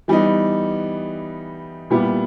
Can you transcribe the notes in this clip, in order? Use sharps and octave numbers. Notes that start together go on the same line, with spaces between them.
E3 G3 B3 D#4
A#2 G3 B3 E4 G4